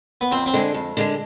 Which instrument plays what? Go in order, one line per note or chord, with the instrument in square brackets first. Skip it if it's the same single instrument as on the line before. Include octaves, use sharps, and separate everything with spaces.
[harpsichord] B3
[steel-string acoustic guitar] F2 [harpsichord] C4
[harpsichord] C4
[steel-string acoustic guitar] D3 G#3 D4
F2
D3 G#3 D4